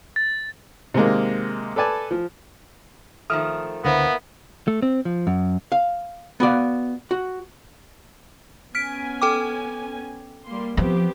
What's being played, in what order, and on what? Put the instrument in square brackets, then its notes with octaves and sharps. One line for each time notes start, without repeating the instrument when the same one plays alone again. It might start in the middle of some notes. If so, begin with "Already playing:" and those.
[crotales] A6
[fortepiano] C3 D#3 G#3 A#3
A4 B4 D5 G#5 A5
F3
[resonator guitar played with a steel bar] D#3 F3 A3 [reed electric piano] D#6 F6
[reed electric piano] C#2 D3 C5 [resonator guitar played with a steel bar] A#3 E4 [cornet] B3
[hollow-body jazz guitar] A3
C4
F3
F#2
F5
B3 F#4 D5 F5
F#4
[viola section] B3 C#4 G#5 [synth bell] F6 B6 D7
[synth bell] A4 G5 D6
[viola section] G3 A#3 C6
[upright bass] F3 [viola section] B3 C4 G4